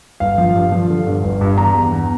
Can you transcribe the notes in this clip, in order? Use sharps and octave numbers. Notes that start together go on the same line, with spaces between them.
G1 F5
F3
G2
F3
D3
G2
G1
G2
E2 A#5
E2
E2